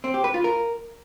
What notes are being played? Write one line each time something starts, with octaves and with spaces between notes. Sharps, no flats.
C4
G4
B4
F4
A#4